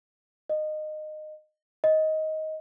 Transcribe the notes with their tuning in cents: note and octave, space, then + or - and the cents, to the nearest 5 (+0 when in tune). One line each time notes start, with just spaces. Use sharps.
D#5 -20
D#5 +15